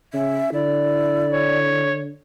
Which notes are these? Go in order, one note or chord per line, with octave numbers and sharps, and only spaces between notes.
C#3 C#4 E5
D3 E4 D5
C#5